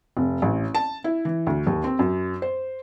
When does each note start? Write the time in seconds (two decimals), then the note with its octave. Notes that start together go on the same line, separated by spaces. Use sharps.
0.17 F1
0.42 A1
0.75 A5
1.04 E4
1.25 E3
1.47 D2
1.67 D#2
1.84 C4
1.99 F#2
2.42 C5